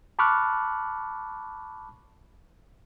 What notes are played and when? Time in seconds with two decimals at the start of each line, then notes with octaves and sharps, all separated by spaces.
0.19 A5 B5 C#6 D6 F6 F#6